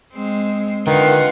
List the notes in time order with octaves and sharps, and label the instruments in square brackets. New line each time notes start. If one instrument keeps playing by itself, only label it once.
[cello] G#3 C4
[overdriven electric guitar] D3 [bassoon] D#3 [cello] F4 F#5 [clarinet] B4